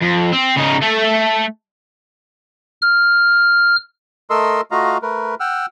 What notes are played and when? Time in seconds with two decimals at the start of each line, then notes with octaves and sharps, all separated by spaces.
0.02 F2
0.33 C4
0.57 C#3 D#4
0.82 A3 A4
2.82 F6
4.30 A3 A4 A#4 D#5 C6 E6
4.71 A3 F4 F#4 D#5 F5 A#5
5.02 A3 A#4 B4
5.40 F#5 G5 E6 F6